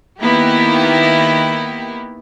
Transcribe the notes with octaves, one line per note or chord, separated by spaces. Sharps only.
D#3 A#3 B3 E4 G4